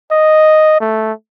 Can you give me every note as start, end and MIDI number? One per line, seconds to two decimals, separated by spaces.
0.11 0.76 75
0.81 1.13 57